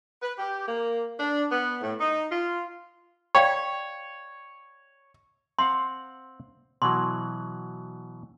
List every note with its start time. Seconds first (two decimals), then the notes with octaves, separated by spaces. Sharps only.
0.23 B4
0.39 G4
0.68 A#3
1.20 D4
1.52 B3
1.83 A2
2.01 D#4
2.32 F4
3.35 C#5 D5 F5 G5
5.59 C4 F5 F#5 C6
6.82 B2 E3 F#3 C6